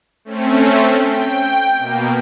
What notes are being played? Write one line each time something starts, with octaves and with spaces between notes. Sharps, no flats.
A3 C4 C#4
G5
B2 A#3